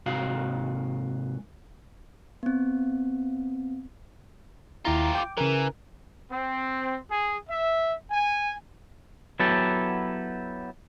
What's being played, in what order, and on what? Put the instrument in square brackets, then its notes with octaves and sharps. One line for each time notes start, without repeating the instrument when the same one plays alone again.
[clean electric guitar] G#2 C3 F#4 F5
[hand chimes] B3 C4
[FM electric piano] D#2 E4 A#5 [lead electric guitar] F4 G4
[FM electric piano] G5 D6
[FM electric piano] C#3 A#4 [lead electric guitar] E3
[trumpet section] C4
G#4
E5
G#5
[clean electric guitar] F#3 B3 E4 G4 A4